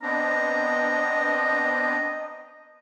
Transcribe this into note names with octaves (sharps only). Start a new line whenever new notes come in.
B3 C4 D4 D#5 A#5